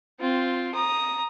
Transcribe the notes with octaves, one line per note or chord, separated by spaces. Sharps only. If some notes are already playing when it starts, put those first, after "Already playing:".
C4 F4
A#5 D#6